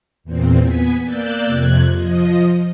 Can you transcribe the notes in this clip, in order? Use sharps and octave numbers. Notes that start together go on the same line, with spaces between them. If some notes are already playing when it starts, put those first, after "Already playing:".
E2 A#2 C4
B3 G#5 B6
A#3 D5 E6 F#6 G6 A6
F2 C3 F#6 G#6
F3 D#5